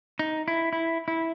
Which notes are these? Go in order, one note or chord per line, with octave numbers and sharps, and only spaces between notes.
D#4
E4
E4
E4